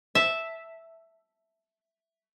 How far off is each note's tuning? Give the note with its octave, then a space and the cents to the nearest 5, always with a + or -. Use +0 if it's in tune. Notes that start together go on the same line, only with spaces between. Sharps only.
E5 -5 A5 +0